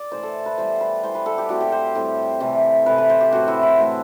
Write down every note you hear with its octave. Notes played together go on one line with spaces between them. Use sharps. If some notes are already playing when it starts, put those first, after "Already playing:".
Already playing: D5
A2 E3 A3 C5
A4
B4
E3 G3 B3 C5
B4
E3 G3 B3 C5
B4
A4
G4
A2 G3 C4 F#4
G4
C5
A2 G3 C4
C3 E3 A3
C3 E3 A3 B4
B4
C5
G4
A2 E3 A3 C4 F#4
E4
E4
A2 E3 A3 C4